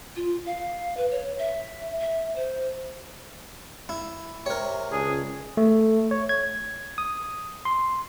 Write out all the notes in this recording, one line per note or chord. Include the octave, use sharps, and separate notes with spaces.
F4
F5
B4
C#5
E5
E5
C5
E4
C3 A#4 C#5
C#2 D4 G#4
A3
C#5
G#6
D#6
C6